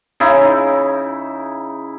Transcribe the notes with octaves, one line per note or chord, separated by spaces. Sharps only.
C#3 D#4 E4